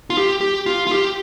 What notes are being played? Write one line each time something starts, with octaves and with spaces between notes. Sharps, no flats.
F4
G4
G4
F4
F4
G4